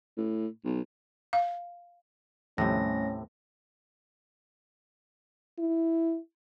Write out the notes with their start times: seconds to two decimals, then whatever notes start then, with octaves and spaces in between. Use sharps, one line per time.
0.17 A2
0.65 B1
1.33 F5
2.58 D#2 A2 C3 F3 G3 A3 C#4 A#6
5.58 E4